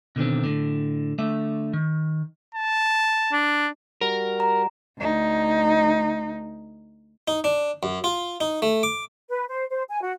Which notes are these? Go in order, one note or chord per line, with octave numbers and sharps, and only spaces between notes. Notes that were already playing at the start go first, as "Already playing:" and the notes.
B2 D3 D#3 C4
A2 D3
D3 A3 E5
D#3
A5
D4
G3 F#4 A#4
A#5
D2 D#4
D#4
D4
F#2
F4
D#4
A3
D6
B4
C5
C5
G#5
F#4